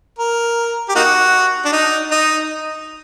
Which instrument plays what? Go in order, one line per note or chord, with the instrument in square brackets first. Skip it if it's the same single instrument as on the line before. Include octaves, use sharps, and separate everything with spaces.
[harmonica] A#4
G4
A#3 D#4 F#4
D4
D#4
D#4